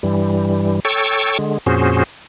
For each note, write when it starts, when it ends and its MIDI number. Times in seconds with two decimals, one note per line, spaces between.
0.03 0.80 43
0.03 0.80 52
0.03 0.80 55
0.85 1.38 69
0.85 1.38 73
0.85 1.38 79
0.85 1.38 85
0.85 1.38 88
0.85 1.38 93
1.39 1.58 50
1.39 1.58 56
1.66 2.04 41
1.66 2.04 46
1.66 2.04 61
1.66 2.04 66
1.66 2.04 68
1.66 2.04 72